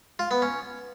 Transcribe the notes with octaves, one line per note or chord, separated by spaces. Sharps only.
F4
B3
C#4